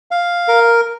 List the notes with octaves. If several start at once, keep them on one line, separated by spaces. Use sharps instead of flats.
F5
A#4